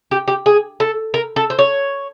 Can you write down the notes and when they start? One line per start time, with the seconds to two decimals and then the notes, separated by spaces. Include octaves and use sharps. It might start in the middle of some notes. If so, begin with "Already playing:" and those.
0.11 G4
0.28 G4
0.46 G#4
0.80 A4
1.14 A#4
1.36 A4
1.50 C5
1.59 C#5